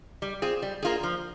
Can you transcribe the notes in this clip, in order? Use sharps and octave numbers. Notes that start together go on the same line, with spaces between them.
G3
C4 F4 G#4
G3
A#3 F4 G#4
F3